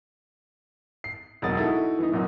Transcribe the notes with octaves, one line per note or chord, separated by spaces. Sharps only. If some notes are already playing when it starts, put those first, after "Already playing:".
C7
E1 G#2 F#3 A#3 D#6 A6
D#4 E4 F#4 A4
E3 D#4
F#2 A#2 F#3 D#4